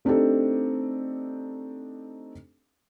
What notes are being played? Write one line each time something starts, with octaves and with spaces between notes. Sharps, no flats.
A3 C4 D4 D#4 G4 A4